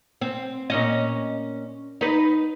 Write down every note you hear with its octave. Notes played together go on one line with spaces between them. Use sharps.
C4
A#2 C#4 D#5
D#4 B4